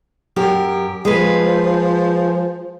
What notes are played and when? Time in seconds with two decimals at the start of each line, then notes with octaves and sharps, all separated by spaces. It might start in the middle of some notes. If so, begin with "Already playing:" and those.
0.36 F#2 G4 A#4
1.05 F3 G#3 G#4 B4